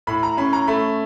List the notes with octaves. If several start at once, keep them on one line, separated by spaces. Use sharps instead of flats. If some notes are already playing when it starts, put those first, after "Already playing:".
A2 B5
A#5
C#4 B5
A#5
A3 B5